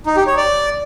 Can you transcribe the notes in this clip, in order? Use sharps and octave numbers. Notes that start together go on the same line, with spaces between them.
D#4
G4
C#5
D5